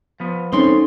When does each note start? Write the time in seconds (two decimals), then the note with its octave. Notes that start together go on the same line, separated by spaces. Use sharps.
0.20 F3 B3
0.52 E2 C4 C#4 D#4 A4 C6